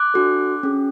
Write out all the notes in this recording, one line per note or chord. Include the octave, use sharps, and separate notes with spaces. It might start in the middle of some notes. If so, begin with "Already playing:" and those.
Already playing: D6 F#6
D4 F#4 A4
C#4 G#4